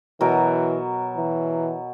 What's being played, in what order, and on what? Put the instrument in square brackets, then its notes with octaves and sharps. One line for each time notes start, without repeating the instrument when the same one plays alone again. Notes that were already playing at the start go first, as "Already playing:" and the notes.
[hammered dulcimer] B2 F#3 A#4 [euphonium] E3
[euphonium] E3